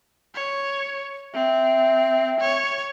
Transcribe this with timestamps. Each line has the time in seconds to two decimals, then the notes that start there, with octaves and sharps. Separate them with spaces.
0.35 C#5
1.34 C4 E5
2.41 C#5